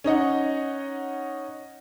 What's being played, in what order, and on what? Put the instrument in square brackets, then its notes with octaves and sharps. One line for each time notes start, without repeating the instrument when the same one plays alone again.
[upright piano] C#4 D#4 D#5 F#5